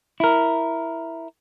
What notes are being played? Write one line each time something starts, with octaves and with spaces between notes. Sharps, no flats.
E4 A#4